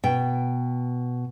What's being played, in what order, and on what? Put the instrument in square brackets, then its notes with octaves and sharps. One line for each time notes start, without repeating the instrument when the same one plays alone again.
[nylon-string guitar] B2 G5